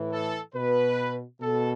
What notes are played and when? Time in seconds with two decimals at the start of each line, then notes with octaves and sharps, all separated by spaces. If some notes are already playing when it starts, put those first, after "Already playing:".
Already playing: A2 E3
0.11 A4
0.54 B2 B4
1.41 B2 A4